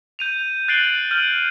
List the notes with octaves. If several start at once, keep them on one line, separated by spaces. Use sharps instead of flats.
G6 D#7 F7
F#6 A6 C7 D7 F#7 G7
F6 G6 D#7 F#7